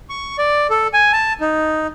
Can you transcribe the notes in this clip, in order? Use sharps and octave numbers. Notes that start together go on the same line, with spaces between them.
C#6
D5
A4
G#5
A5
D#4